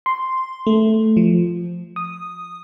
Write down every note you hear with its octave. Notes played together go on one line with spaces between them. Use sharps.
C6
A3
F3
D#6